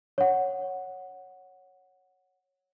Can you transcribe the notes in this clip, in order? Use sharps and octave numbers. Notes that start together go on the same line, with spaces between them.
C#5 F#5